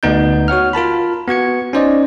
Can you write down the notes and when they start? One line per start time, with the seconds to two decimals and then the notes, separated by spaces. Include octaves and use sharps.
0.03 D2 B3 D#4 G6
0.48 F#4 C#5 F#5 F6
0.73 F4 A#4 A5 B5
1.28 B3 F#4 G#6 C#7
1.73 C#4 D#4 C5 D5 D#5